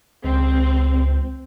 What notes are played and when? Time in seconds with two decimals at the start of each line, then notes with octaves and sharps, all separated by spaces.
0.24 C#2 C4